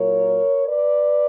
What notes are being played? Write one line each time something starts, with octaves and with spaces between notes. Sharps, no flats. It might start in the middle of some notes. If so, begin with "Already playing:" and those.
Already playing: A#2 F#3 A#4 C#5
B4 D5